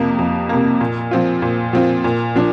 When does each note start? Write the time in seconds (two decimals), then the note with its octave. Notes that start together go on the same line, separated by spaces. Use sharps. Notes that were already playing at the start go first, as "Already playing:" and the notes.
Already playing: F2 C3 A#3
0.19 F2
0.49 C3 A#3
0.81 A#2
1.11 F3 C4 F4
1.42 A#2
1.73 F3 C4 F4
2.04 A#2
2.36 F3 D4